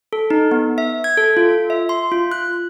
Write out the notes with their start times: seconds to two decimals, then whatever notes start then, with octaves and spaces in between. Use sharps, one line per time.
0.13 A4
0.30 D#4
0.51 B3
0.78 E5
1.04 G#6
1.17 A4
1.37 F4
1.70 E5
1.89 C6
2.12 F4
2.31 F#6